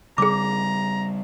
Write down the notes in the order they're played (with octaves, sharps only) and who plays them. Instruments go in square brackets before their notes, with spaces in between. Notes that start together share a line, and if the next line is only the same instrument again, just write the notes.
[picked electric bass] C#3 G3 [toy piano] G#4 D6 [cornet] A#5